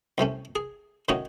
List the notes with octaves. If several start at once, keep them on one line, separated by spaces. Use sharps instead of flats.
C2 C3 A3 C#4
G#4
A2 D#3 C#4 D#4 F#4 C#5